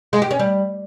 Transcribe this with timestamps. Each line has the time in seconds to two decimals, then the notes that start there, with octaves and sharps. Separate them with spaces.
0.13 G#3
0.22 G4
0.31 C#4
0.39 G3